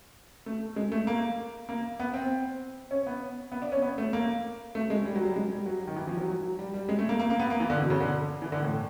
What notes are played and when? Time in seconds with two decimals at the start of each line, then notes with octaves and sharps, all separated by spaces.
0.46 A3
0.76 G#3
0.92 A3
1.07 A#3
1.69 A#3
2.00 B3
2.14 C4
2.91 C#4
3.07 B3
3.52 B3
3.62 D4
3.72 C#4
3.82 B3
3.98 A3
4.13 A#3
4.75 A3
4.90 G#3
5.05 G3
5.16 F#3
5.25 G3
5.36 G#3
5.52 G3
5.66 F#3
5.87 D#3
5.96 E3
6.07 F3
6.17 F#3
6.28 F#3
6.43 F#3
6.59 G3
6.74 G3
6.89 G#3
6.99 A3
7.09 A#3
7.20 A#3
7.30 A#3
7.39 B3
7.50 A#3
7.60 E3
7.70 D3
7.81 B2
7.90 C#3
8.00 D3
8.42 E3
8.52 D3
8.63 A2